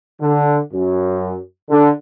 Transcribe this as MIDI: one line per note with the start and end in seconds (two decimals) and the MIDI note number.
0.21 0.58 50
0.73 1.36 42
1.70 1.89 50